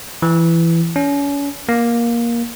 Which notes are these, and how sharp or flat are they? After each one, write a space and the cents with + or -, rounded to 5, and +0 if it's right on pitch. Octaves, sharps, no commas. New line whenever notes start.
E3 +15
C#4 +35
A#3 +15